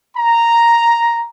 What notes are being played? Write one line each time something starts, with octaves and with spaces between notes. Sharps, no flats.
A#5